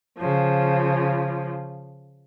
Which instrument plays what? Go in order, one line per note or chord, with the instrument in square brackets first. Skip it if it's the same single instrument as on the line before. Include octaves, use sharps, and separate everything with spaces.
[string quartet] C#3 F3